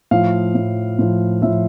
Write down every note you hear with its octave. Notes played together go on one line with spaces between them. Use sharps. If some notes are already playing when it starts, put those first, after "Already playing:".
A2 F3 F5
A2 F3
A2 F3
A2 F3 E5